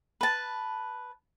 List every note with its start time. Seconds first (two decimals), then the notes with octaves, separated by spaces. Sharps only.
0.21 B4 A5